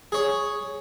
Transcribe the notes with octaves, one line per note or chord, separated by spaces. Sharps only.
G#4 C#5